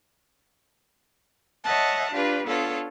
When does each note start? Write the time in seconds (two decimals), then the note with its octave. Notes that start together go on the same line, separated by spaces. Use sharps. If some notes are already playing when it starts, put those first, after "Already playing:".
1.63 C#5 D#5 E5 F#5 A5
2.12 D4 F4 G4 B4
2.46 B3 D4 F4 A4 C#5